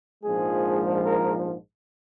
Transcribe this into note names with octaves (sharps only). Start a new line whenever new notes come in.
A#1 G#2 F3 G#3 G#4
A#4